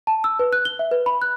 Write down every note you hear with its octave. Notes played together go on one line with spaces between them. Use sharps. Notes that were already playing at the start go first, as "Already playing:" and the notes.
A5
E6
B4
F#6
G7
E5
B4
B5
F#6